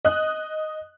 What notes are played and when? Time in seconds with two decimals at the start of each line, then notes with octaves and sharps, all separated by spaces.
0.05 D#5 D#6 F#6